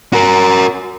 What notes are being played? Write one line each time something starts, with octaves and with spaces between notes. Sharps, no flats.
F#4 A#4